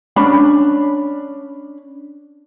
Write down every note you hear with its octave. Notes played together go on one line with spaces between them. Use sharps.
C#4 D4 B5